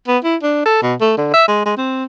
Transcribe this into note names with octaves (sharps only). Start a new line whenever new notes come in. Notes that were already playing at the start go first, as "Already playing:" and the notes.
B3
E4
D4
A4
B2
A3
D3
E5
G#3
G#3
C4